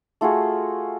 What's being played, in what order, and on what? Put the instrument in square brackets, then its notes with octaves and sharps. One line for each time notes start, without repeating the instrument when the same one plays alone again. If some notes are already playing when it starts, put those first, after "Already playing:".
[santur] A3 F4 F#4 G#4